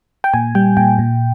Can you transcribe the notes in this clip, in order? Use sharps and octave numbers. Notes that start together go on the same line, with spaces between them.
G5
A#2 G#5
G3 G5
A#2 G5
A#2